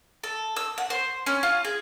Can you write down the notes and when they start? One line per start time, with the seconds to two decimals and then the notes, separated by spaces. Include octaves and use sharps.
0.23 A4
0.56 E6
0.78 F#5
0.90 C5
1.26 C#4
1.43 F4
1.65 G#4